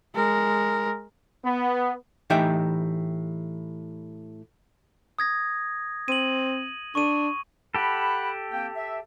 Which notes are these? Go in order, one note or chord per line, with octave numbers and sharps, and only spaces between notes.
G#3 A#4
B3
A2 E3 D#4 G4 E5 G5
D#6 G#6 A#6
C4 D#7 F#7
D4 C#6 D#7
G4 A4 F#5 B5
A#3 C4 G5
E5